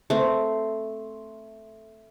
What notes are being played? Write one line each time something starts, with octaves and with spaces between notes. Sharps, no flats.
A3 C4